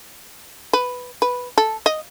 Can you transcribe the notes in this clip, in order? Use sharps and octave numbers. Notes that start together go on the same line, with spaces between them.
B4
B4
A4
D#5